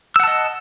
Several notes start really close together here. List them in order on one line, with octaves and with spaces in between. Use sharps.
E6 F#5 A5 D#5